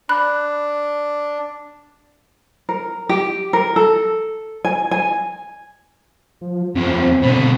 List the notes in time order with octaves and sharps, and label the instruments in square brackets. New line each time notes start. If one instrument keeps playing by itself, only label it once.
[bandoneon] D4 [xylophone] B5 F#6
[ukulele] A#4
G4
A#4
A4
G#5
G#5
[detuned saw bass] F3
[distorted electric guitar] E2 F3 [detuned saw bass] C4
[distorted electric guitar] B2 D3